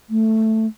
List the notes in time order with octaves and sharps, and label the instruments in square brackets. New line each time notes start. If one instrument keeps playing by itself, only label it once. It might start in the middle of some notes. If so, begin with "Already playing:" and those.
[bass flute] A3